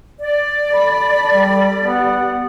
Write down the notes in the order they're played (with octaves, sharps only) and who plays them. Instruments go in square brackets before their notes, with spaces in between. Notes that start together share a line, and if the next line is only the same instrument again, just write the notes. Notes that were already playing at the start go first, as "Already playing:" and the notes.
[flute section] D5
[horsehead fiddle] A4 B5
[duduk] G3
[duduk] B3 [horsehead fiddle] G4 F#5